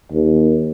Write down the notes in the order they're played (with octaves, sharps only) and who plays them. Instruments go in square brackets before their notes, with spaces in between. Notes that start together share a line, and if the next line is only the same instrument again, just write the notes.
[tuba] D#2